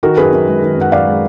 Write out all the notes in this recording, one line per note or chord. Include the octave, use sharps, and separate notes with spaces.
D#3 F#4 A#4
F#2 G#4 B4
F#2
G#3
D#3
F#2 F#5
F#2 D5 F5
G#3